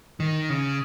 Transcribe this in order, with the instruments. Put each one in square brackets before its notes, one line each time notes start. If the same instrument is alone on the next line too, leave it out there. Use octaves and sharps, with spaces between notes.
[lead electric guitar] D#3
C#3